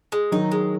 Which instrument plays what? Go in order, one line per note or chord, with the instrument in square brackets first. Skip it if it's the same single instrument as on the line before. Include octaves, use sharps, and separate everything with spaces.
[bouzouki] G#3
[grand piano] D#3 F#3 [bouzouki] D#4
[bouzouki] G#3